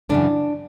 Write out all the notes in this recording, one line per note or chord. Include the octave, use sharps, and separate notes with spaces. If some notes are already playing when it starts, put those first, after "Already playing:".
F#2 C#3 E3 D4